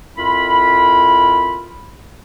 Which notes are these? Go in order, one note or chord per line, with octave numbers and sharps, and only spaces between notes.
F2 E4 F4 A#4 B5